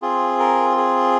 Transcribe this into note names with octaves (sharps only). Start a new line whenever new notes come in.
C4 F4 G#4
A#4
G#4